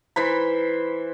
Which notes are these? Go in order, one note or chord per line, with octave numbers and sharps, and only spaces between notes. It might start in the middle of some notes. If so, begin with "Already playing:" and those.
E3 C5 B5